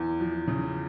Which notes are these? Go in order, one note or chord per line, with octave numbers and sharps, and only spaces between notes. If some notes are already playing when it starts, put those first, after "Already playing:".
Already playing: E2
F3
C#3